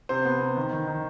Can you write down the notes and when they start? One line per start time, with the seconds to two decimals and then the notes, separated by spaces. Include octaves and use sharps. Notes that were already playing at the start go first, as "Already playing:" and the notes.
0.09 C3 C5
0.25 B3
0.41 C3
0.57 D#3
0.73 D#3
0.87 D#3